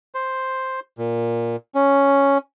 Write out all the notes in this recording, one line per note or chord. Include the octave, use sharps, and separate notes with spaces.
C5
A#2
C#4